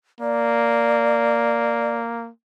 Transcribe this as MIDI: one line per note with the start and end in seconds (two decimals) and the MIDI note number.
0.21 2.30 58
0.21 1.97 74